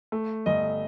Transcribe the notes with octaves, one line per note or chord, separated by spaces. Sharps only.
A3
G1 D#5